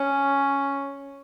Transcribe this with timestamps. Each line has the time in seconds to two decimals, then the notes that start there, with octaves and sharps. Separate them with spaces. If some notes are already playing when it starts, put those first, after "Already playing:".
Already playing: C#4